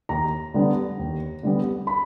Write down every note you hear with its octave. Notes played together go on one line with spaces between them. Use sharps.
D#2 A#5
D3 G3 B3
D#2
D3 G3 B3
B5